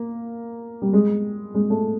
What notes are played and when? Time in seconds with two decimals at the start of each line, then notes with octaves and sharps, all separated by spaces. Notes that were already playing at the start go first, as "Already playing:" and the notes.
Already playing: A#3
0.82 G3
0.93 G#3
1.55 G#3
1.70 A3